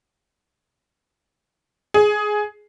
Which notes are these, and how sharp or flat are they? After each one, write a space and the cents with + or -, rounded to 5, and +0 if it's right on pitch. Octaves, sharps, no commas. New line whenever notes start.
G#4 +10